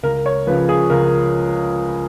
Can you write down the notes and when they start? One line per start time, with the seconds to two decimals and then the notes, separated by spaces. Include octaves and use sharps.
0.03 C#2 A#4
0.26 C#5
0.47 C#3 F3 B4
0.69 G#4
0.90 C#2 A#4